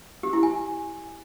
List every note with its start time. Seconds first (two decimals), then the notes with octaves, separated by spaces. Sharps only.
0.23 G4
0.33 E4
0.43 G#5